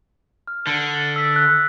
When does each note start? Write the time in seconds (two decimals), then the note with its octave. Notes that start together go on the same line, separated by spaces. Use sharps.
0.47 F6
0.67 D3
1.16 E6 B6
1.36 F#6